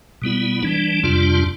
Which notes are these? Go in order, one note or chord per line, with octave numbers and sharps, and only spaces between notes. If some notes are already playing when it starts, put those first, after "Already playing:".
B2 G3 B3 E4
E3 G3 D4
F2 C3 G3 D4 F4